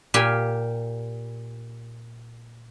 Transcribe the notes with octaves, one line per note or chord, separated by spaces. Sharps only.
A#2 G4 F5 G5 G#5 B5